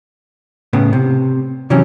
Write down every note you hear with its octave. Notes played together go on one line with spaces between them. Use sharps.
A2 C#3 B3
C3
C3 E3 F#3 C#4